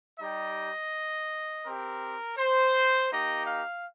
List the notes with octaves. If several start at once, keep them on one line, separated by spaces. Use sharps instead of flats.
G3 D#4 G4 D#5
C4 G4 A#4
C5
A#3 D#4 G4 D#5
F5